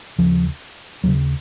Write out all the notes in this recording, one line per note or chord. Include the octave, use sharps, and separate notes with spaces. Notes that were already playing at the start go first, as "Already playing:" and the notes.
D#2 C#3 F3
D#2 C#3 F#3